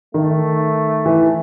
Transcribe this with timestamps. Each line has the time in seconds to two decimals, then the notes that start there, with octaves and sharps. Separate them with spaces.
0.14 D#3 A3
1.06 E3